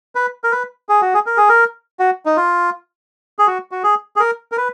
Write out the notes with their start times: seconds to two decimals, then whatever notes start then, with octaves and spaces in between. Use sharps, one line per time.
0.15 B4
0.44 A#4
0.52 B4
0.89 G#4
1.01 F#4
1.14 G#4
1.26 A#4
1.37 G#4
1.49 A#4
1.99 F#4
2.26 D#4
2.37 F4
3.39 G#4
3.47 F#4
3.71 F#4
3.84 G#4
4.16 G#4
4.20 A#4
4.52 A#4
4.57 B4